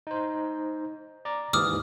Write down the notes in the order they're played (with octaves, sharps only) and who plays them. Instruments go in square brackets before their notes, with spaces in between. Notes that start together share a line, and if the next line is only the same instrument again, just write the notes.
[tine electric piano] D#4 C5
D5 A#5 D6
[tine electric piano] D#2 G#2 E3 [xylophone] D6 D#6 F6